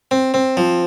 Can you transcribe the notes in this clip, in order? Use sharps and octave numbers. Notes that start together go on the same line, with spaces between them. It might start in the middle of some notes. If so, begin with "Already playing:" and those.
C4
C4
F3